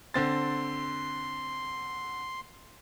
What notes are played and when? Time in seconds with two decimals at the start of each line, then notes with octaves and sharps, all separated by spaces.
0.14 D3 C4 C6 A6